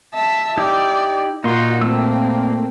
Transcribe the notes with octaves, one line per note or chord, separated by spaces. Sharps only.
E5 A5
D#4 E4 G4 D5
A#2 A#3 D#4 F4 F#4 C6
A3 C4 E6